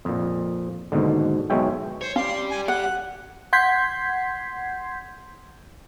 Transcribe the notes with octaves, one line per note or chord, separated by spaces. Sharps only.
F2 A#2
D#2 G#2 B2 D3
B1 B2 G#3 C#5 E5 G5
C5 C#5
C4 C#4 G4 D5 F5 C6
G#5
F#5 F#6
F#5 C6 G6 G#6 B6 C7